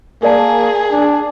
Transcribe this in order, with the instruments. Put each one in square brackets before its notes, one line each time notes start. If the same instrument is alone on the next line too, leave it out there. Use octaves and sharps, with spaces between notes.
[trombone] A#3 [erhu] G#4 [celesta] A#4 D5 A5
[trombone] D4